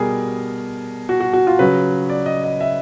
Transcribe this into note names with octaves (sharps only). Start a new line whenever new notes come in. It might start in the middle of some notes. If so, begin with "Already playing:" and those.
Already playing: B2 G3 G#4 A#4
F#4
F#4
F#4
F4
C#3 F#3 B4
D5
D#5
D#5
E5